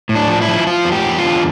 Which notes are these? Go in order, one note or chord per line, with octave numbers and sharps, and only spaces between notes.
A2
D4
F3
E4
F3
F3 F4
E2
G4
E2
F4
D3